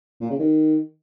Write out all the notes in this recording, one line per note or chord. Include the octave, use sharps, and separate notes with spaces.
A#2
C#3
D#3